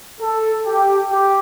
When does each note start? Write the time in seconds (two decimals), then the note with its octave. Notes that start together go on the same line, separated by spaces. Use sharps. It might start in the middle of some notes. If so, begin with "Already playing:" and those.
0.21 A4
0.66 G4
1.11 G4